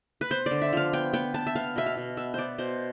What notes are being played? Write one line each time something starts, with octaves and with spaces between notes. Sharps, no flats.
B4
B3 C5
D3 D5
E5
F3 F5
B3 G5
B3 G5
B3 A5
E5
B3 F5
B2 E5
F5
B2
B3 E5
B3 C5 D5
B2 C5